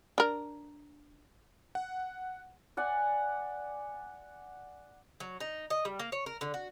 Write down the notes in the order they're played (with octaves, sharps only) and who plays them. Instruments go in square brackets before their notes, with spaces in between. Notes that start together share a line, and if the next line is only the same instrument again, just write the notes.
[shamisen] D4 A#4
[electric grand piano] F#5
[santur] D5 F#5 G#5
[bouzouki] F#3
D#4
D#5
G3
A#3
C#5
A#4
D3
F#4